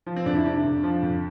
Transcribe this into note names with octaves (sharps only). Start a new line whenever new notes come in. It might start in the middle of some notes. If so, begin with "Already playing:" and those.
F3
C4
F2 D4
E4
C3 D4
F2
F3
F2